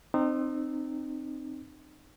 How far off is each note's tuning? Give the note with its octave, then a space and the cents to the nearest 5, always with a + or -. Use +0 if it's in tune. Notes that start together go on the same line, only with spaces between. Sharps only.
C4 +5 D#4 -30